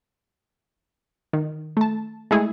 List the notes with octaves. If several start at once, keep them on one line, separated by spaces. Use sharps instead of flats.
D#3
A3 A5
G#3 A3 E4 G#4